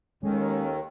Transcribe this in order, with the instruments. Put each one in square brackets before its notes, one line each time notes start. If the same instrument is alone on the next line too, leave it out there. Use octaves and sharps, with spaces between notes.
[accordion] D#2 D#3 [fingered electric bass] G#3 [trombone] C#4 [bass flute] A4